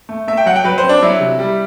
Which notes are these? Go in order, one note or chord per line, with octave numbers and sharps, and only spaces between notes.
A3
A3 E5
G5
F#3 F#5
G5
F#3 B4
C5
C4
D4
F#3 E4
C3
G3